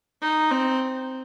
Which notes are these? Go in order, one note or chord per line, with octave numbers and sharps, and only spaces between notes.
D#4
C4